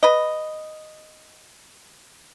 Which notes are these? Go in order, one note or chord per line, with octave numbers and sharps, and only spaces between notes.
B4 D#5